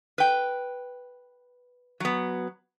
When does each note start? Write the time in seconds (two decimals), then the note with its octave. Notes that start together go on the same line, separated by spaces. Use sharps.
0.18 B4 G5
2.00 F#3 B3